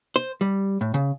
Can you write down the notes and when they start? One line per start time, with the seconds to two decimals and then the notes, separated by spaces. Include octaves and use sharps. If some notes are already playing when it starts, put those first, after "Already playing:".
0.16 C5
0.41 G3
0.81 A2
0.94 C#3